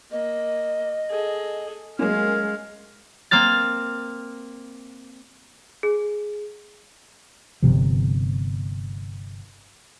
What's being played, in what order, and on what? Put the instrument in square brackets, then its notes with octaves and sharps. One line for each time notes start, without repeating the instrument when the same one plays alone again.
[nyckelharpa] A#3 [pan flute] D#5
[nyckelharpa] G#4 A4
[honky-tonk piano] F#3 A#3 C#4 [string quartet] G#3 [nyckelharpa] F5
[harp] A#3 C4 F6 A6
[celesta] G#4
[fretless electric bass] G1 C2 C3 F3